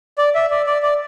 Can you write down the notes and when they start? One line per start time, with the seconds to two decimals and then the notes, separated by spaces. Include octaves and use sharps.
0.18 D5
0.35 E5
0.51 D5
0.67 D5
0.82 D5